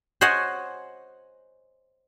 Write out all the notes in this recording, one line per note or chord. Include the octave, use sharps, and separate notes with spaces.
C5 C#5 D#5 F#5 G#5